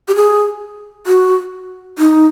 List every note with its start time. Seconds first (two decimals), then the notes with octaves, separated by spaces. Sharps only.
0.08 G4
0.15 G#4
1.07 F#4
1.99 D#4